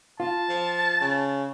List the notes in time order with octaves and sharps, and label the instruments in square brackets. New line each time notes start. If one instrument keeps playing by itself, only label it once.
[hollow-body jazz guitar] F4 [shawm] A5
[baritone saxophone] F3
C#3